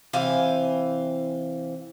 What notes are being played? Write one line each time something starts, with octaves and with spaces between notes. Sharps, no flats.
C3 E3 C5 F5 G#5